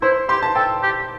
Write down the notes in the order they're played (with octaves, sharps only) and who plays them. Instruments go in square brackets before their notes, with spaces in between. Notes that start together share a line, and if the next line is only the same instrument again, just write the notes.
[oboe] E4 [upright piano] C5
[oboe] G4 [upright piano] C6
[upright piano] A5
[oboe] A4 [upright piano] G5
[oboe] G4